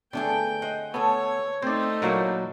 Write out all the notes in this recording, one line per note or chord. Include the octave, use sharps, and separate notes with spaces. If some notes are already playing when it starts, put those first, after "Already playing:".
D3 A3 B3 G#4 G5
C5 D#5 F#5
A3 B3 A4 C#5
A3 C4 D#4 C5 D5
A#2 F#3 A#3 E4 F#4 C5